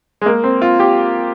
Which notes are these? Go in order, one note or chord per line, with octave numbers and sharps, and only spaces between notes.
G#3
A#3
C4
F4
G4